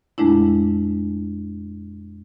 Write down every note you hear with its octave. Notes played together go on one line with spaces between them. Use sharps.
F2 A#2 G#3 A3 D4 E4